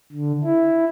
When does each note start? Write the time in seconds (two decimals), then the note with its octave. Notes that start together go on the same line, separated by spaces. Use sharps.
0.12 D3
0.44 E4